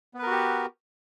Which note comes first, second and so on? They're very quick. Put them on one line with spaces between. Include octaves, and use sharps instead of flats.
B3 B4 A#4 F#4 G4